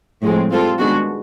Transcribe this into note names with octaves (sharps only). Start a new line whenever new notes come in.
A2 F3 G#3 C4
G3 C4 F4 A4
D#3 G#3 B3 D4 F#4